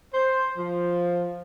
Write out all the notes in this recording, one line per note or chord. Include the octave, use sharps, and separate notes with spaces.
C5
F3